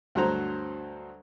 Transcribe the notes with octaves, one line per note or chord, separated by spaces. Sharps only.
D2 G2 F#3 C5 A#5